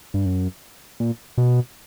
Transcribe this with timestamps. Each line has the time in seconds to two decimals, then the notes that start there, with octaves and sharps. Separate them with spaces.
0.14 G2
0.26 F#2
1.00 A#2
1.38 B2